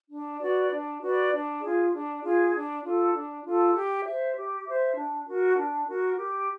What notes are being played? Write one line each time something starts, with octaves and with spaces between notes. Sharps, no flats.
D4
F#4 B4 D5
D4
F#4 B4 D5
D4
F4 G#4
D4
F4 G#4
D4
F4 A4
D4
F4 A4
G4
C5 E5
G4
C5 E5
D4
F#4 A#4
D4
F#4 A#4
G4